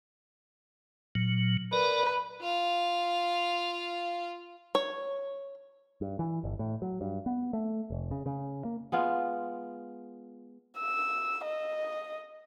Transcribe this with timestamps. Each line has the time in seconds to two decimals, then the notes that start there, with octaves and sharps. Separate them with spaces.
1.15 A#2 F#3
1.73 A#4 B4 D5
2.41 F4 F5
4.75 C#5
6.01 G2
6.19 E3
6.44 G1
6.59 A2
6.82 F#3
7.01 G2
7.26 B3
7.53 A3
7.90 F1
8.11 C#3
8.26 C#3
8.65 A#3
8.92 G#3 B3 F4
10.78 E6
11.45 D#5